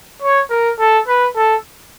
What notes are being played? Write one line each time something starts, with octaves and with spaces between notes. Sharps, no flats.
C#5
A#4
A4
B4
A4